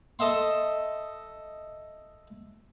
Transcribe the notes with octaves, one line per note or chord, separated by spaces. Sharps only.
A4 D#5 E5 C6